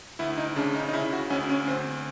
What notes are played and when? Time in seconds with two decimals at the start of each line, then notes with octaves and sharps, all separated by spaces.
0.19 D2 E4
0.37 D#4
0.56 C#3 D4
0.75 D#4
0.89 D#4
0.93 C#3 E4
1.13 F#4
1.30 D2 C#4
1.49 C#4
1.67 D2 C4